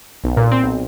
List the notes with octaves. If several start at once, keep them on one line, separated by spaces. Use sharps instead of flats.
B1
A#2
C4
B1